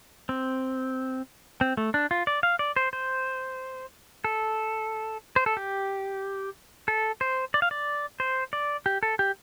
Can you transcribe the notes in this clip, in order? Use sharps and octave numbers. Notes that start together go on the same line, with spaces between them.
C4
C4
A3
D4
F4
D5
F5
D5
C5
C5
A4
C5
A4
G4
A4
C5
D5
F5
D5
C5
D5
G4
A4
G4